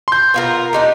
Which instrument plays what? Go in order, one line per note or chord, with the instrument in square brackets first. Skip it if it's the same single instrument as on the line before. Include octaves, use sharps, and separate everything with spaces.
[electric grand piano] C6 G6
[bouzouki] B3 F4 A#4
D4 D#4 G4